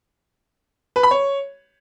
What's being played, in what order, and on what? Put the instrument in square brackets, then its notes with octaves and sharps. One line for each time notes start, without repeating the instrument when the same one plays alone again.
[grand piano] B4
B5
C#5